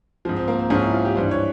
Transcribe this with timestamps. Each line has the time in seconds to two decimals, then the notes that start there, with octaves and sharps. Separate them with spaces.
0.25 G#2 F3 C4
0.36 C4
0.48 A#3
0.59 C4
0.70 G#2 F3 C#4
0.82 E4
0.94 F4
1.05 G4
1.16 G2 E3 G3 C5
1.31 C#5